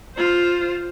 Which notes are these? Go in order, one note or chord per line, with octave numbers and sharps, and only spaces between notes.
F4 C5